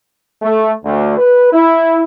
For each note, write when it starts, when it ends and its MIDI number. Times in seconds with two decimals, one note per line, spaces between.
0.42 0.71 57
0.84 1.14 38
1.18 1.51 71
1.53 2.02 64